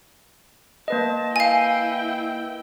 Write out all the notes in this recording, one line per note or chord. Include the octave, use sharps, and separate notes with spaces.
A#3 B4 D#5 A5
E4 F5 G5 G#5